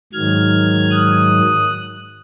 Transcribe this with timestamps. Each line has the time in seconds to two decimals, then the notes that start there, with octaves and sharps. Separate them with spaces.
0.12 G#2 D#3 F#3 F6 G#6
0.91 D#6 F#6